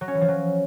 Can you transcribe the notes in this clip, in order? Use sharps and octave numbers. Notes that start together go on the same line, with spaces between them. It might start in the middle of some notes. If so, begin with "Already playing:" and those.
F#3
C#4
E3
F3
F#3